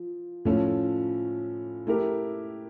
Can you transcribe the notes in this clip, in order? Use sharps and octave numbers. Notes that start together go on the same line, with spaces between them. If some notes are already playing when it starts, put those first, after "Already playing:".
Already playing: F3
A2 F3 A3 C#4
A3 E4 G4 A#4